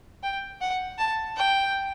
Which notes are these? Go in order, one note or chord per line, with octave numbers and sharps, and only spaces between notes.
G5
F#5
A5
G5